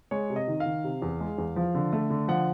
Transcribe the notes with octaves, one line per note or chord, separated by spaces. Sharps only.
G#3 C#5
C3
D#5
D#3
F5
D#3
C3
E2
G#3
E2
F3
D3
A3
D3
F3 F#5